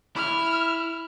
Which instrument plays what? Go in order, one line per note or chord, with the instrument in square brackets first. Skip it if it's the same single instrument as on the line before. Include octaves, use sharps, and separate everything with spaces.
[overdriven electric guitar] E4 [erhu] F6